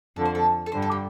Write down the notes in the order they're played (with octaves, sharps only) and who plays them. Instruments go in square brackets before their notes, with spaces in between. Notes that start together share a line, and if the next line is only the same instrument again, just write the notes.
[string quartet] F2 D3 F3 [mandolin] A4
[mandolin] C5
A4
A4
[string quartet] G2 D3 G3 [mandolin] C5
[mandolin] A4
G4